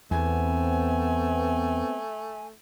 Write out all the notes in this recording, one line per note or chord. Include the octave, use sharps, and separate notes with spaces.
E2 A3 B3 C4 G#5